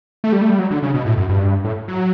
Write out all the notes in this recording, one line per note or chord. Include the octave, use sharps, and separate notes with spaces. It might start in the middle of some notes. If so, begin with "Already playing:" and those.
A3
G3
A3
G3
F#3
D3
C#3
B2
A2
F#2
G2
A2
F#3